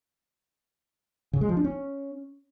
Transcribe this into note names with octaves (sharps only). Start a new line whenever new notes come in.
C#3
G#3
F3
D4
C#4